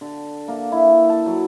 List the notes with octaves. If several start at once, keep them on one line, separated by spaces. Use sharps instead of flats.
D3
A#3
E4
A5
F#3